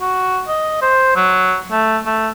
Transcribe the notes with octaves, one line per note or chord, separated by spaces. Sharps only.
F#4
D#5
C5
F#3
A3
A3